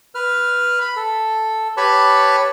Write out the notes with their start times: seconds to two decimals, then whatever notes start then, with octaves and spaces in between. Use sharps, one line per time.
0.15 B4 F6
0.81 B5
0.96 A4
1.77 G4 B4 C#5 A5 B5 C#6